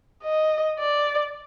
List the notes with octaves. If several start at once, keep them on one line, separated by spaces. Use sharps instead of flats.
D#5
D5